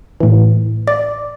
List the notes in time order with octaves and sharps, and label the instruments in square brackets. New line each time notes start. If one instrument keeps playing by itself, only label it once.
[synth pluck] A2 E3
D5